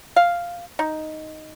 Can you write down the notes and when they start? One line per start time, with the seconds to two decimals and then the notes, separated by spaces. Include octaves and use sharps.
0.16 F5
0.79 D#4